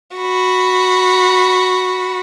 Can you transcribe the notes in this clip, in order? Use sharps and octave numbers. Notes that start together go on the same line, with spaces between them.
F#4 B5